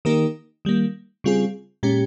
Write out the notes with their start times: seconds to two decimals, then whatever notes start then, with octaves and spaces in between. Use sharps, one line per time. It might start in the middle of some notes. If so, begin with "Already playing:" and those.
0.05 D#3 A#3 D#4 G4 A#4
0.65 D#3 G3 A#3
1.24 C#3 G3 C4 F4 G#4
1.83 A#2 G#3 C#4 G4